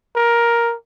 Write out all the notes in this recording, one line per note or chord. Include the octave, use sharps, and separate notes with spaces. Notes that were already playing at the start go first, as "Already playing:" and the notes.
A#4